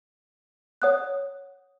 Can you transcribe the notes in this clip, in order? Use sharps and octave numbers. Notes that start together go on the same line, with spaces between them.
C#5 F#5 D#6 F#6